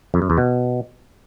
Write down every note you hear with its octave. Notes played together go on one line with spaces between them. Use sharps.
F2
F#2
E2
B2